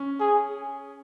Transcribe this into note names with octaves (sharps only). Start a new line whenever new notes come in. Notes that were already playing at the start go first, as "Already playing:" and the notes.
Already playing: C#4
G#4